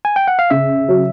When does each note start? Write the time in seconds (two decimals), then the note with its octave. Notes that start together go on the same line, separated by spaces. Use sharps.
0.05 G#5
0.16 G5
0.28 F#5
0.39 F5
0.50 C#3 E5
0.88 F#3